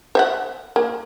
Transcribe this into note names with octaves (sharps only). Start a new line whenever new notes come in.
C5 E5 F#5
A#3